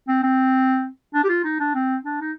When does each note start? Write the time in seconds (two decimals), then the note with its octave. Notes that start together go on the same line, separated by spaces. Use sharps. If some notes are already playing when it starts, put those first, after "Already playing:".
0.08 C4
0.23 C4
1.14 D4
1.24 G4
1.29 F4
1.44 D#4
1.60 D4
1.75 C4
2.05 D4
2.21 D#4